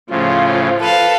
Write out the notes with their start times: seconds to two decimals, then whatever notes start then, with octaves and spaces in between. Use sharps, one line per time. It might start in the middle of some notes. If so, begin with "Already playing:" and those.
0.10 A2 C#3 F3 F4
0.81 A4 B4 F5